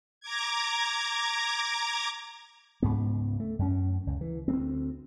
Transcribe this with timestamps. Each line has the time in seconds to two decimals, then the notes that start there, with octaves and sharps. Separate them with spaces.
0.20 A#5 D6 G#6
2.82 C#2 G#2 B3
3.40 A3
3.59 F#2 C#4
4.07 C#2
4.21 E3
4.48 D2 B3 C4